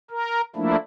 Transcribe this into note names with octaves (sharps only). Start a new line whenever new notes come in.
A#4
F3 A3 A#3 D4 E4